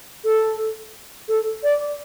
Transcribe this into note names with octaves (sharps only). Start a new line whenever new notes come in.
A4
A4
D5